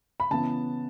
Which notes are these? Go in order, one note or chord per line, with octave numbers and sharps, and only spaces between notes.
B5
C#3 E3 B3 A5